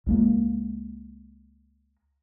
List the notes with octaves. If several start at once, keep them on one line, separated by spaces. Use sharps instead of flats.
C#2 G#3 A#3